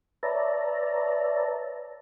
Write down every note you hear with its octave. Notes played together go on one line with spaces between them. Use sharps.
B4 C#5 D5 E5 A5 A#5